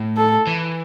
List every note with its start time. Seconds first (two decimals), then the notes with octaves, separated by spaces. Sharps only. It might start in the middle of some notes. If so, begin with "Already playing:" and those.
Already playing: A2
0.17 A4
0.47 E3